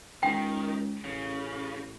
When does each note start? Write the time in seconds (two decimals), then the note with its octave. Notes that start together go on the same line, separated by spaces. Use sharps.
0.23 C#2 D#3 G5
1.05 A1 C#3